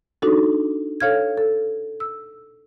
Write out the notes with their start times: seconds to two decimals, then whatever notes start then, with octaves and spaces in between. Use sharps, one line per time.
0.22 D4 D#4 F#4 A4
1.00 A4 C#5 F5 F6 G#6
1.37 A4
2.00 E6